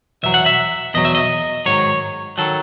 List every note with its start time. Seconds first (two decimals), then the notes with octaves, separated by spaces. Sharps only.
0.23 E2 B2 F#3 E5
0.34 F#5
0.46 E5
0.94 E2 B2 F#3 D#5
1.05 E5
1.15 D#5
1.66 G#2 D#3 F#3 C#5
2.38 D#3 F#3 A4